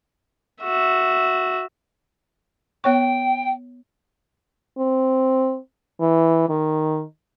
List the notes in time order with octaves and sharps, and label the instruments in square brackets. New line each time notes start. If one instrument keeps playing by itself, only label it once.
[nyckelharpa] F#4 E5
[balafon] B3 C#5 C#6 [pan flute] G5
[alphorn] C4
E3
D#3